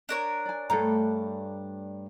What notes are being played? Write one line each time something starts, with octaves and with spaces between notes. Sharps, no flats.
D4 A#4 C#5
D5 G#5
G2 A3 A4 A#5